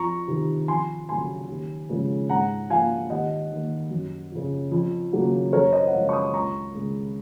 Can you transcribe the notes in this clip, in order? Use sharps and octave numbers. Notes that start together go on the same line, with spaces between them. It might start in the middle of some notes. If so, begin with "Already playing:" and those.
Already playing: F2 A#5 C#6
C3 D#3
F2 G#5 C6
C#3 F#3 G#5 C6
D#2
C#3 F3 G#3
G#2 F#5 A#5
F3 A#3 F5 G#5
D#2 D#5 F#5
D#3 A#3
F#2
C#3 F3
F2
C#3 F#3 A#3
F#2 A#4 C#5
C5 D#5
F#5
C#3 F3 G#3 C#5 F5
C#6
C6 D#6
C#2 A#5 C#6
C#3 G#3